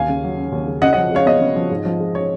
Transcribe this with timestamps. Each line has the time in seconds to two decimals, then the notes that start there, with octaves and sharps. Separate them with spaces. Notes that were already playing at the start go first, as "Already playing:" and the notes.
Already playing: D#2 F5 G#5
0.09 C#3
0.24 F#3
0.38 C#4
0.52 D#2
0.67 C#3
0.82 C#3 D#5 F#5
0.93 F3 D#5 F#5
1.11 G#3 C#5 F5
1.26 B3 D#5
1.41 C#3
1.56 F3
1.70 G#2
1.85 F3
2.00 G#3
2.15 C#5